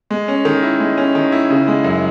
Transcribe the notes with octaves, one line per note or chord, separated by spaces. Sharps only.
G#3
C#4
D#3
E4
G#3
C#4
D#3
E4
C#3
G#3
F#2